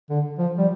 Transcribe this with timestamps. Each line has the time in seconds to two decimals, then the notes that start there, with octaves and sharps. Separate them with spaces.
0.10 D3
0.38 F3
0.58 G3